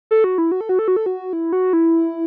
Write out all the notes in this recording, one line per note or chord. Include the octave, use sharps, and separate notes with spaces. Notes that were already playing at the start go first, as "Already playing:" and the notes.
A4
F#4
E4
F#4
A4
F#4
A4
F#4
A4
F#4
E4
F#4
E4